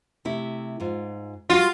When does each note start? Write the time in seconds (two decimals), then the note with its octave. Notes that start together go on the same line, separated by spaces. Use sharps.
0.25 C3 A3 E4
0.80 G#2 F4
1.50 G3 F4 F#4